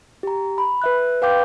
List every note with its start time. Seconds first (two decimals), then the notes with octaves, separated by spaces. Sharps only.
0.23 G4 A#5
0.58 B5
0.82 B4 E5 F#6
1.22 B4 F5 G5 C6 D6 G6